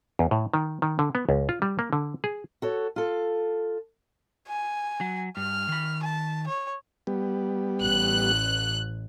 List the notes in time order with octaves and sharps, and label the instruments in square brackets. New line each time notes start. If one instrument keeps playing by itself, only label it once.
[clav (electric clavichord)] E2
A2
D#3
D#3
D3
B3
C#2
F4
G3
A#3
D3
G#4
[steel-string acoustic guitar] F#4 A4 C#5
F4 A4
[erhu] G#5
[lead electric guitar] F#3
[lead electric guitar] G2 [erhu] F6
[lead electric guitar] D#3 B5
[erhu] A5
C#5
[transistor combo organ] G3 B3
[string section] A1 F#6